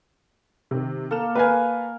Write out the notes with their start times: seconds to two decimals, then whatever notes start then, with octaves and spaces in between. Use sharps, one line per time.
0.71 C3 D#3
1.11 A#3 A4 F6 E7
1.35 A#4 B4 F5 G#5